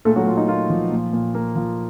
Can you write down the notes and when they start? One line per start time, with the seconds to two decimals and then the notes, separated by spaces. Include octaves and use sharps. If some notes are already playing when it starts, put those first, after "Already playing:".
0.05 A#2 A3 A4
0.16 F#3 F#4
0.27 A#2 F4
0.37 D#4
0.48 A#3 F4
0.70 F3
0.91 A#2
1.13 A#2
1.35 A#3
1.56 F3